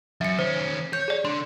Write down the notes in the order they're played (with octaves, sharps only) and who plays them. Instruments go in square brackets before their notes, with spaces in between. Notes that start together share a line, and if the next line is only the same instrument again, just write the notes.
[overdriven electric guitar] F#2 [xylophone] E5 C#7
[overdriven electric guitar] D#3 C#4 [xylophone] C5
[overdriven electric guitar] C#5 [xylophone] G6
[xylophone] G#4 D5
[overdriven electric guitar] D3 D4 [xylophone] C6